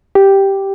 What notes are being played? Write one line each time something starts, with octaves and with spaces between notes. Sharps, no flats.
G4